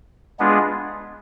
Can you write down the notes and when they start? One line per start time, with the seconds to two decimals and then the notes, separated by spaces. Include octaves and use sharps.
0.39 G#3 B3 D4 F4 G#4